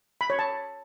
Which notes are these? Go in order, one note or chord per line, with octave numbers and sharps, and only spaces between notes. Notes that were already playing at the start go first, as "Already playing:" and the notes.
B5
C#5
A5